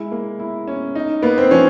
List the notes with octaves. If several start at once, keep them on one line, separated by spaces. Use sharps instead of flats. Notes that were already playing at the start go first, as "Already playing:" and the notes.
Already playing: G#3 E4
A#3
E4
C#4
D#4
A#3 B3
C4
F3 C#4